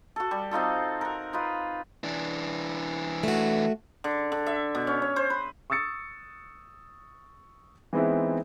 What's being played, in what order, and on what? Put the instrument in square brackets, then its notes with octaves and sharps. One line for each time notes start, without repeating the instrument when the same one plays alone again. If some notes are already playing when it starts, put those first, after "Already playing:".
[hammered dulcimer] F#4 A4
G3
C4 D#4 F4 A4
A#4 F#5
D#4 F4 B4
[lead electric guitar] E3 D4
[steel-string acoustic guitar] A3 F#4
[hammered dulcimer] D3
D3
E5
B2
C#4
C#5
C5
B4
[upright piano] C#6 D#6 E6 A6 C#7
E3 G#3 B3 C4 D#4 E4